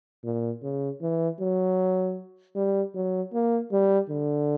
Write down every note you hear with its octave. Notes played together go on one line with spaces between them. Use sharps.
A#2
C#3
E3
F#3
G3
F#3
A#3
G3
D3